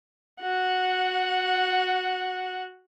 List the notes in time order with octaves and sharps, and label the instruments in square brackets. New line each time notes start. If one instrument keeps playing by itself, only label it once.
[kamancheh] F#4 F#5